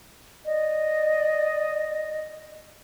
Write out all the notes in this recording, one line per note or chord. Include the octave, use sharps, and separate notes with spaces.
D5 D#5